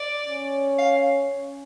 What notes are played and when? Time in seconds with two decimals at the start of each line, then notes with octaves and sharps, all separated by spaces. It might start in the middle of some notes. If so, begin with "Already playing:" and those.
Already playing: D5
0.26 C#4
0.79 F5